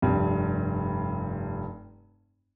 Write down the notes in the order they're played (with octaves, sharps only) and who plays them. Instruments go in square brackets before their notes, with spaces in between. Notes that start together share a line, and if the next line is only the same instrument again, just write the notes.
[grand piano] F1 G2